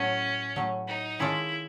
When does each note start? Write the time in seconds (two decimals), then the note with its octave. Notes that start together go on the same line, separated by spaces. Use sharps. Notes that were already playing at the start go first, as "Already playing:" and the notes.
Already playing: A2 F#3 A3 C#4
0.56 A2 F#3 A3
0.87 D#4
1.19 D#3 G#3 C#4 E4 F4 A4